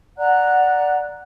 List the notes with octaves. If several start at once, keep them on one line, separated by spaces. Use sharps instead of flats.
D5 F#5 A#5 F#6